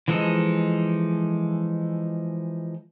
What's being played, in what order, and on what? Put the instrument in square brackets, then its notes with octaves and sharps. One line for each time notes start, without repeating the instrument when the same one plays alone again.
[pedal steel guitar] E3 F3 G#3 D#4 A4